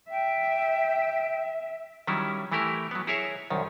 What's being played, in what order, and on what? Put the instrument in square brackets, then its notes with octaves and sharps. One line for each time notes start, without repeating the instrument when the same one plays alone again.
[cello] E5 [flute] G5
[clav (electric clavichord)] D#3 F#3 G3 C#4 E4
E3 A3 E4 G4 A#4
F#3 B3
E4 G#4 A#4 C#5 E5
C2 F#2 D#3